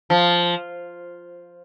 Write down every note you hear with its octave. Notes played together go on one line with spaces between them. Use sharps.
F3